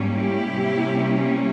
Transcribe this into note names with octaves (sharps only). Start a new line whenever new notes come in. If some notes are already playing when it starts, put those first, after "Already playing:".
Already playing: G#2 G3 A#3 C#4
E4 G4
C3 G3 A#3 C#4